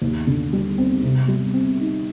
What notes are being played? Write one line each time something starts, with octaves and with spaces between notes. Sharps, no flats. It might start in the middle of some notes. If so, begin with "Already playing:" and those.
D#2
D3
G3
C4
C3
G3
C4
D#4